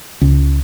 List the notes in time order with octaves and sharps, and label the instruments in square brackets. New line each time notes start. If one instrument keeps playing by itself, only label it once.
[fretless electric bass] C#2